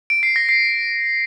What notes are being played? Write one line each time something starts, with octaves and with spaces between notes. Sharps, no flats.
D7
C7
A#6
C7